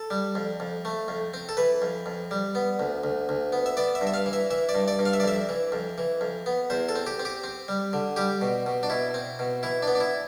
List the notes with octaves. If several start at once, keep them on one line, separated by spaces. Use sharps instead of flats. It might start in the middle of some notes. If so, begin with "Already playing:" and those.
Already playing: A4
G3
F2
F2
A3
F2
C4
A4
E3 B4
F2
F2
G3
B3
D2
D2
D2
B3
E5
B3 D5
E5
G2
E5
F5
E3
E5
E3 E5
D5
G2
D5
G2
F5
E5
D5
F2 E5
E3
F2
E3
F2
B3
E2 C5
A4
C4
G4
C4
G4
C4
G3
D3
G3 G4
B2
B2
D4
B2 E4
C4
B2
E3 E4
D4
B3
D4
E4